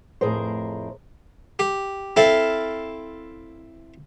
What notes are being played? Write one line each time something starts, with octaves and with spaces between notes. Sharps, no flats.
F2 A2 G#4 A#4 C5
G4
C4 E4 A4 F5